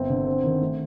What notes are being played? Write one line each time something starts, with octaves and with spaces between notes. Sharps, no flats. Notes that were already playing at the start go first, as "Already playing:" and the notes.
Already playing: G1 C4
D3
C4
D#3
A3